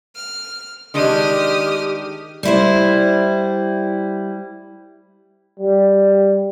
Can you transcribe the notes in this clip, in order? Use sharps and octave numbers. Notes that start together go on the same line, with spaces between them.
F6
D#3 G#3 D4 G4 D#6 F6
G3 E4 C5
G3